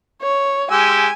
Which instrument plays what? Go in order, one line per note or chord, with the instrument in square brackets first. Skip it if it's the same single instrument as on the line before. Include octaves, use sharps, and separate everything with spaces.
[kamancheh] C#5
[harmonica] G#3 G4 E6 [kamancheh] G#5